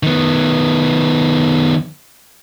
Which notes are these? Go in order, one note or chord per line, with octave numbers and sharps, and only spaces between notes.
D#3 B3